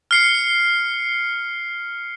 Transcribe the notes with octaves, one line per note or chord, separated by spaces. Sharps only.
F6 C7 C#7